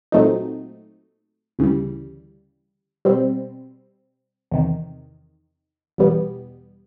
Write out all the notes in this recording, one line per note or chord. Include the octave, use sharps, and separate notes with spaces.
A#2 F#3 A3 C4 D#4
D2 C#3 E3 G3
B2 G3 C4
E2 C3 D#3
E2 B2 G3 B3